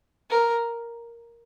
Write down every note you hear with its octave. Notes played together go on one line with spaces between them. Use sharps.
A#4